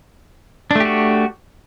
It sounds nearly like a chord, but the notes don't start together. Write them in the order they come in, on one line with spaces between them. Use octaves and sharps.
D4 A3 G4 F#4